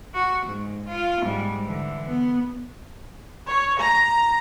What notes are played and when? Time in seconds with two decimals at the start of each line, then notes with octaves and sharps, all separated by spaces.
0.14 F#4
0.46 G#2
0.88 F4
1.24 G#2 G3
1.65 D3 E3
2.09 B3
3.49 C#5
3.80 A#5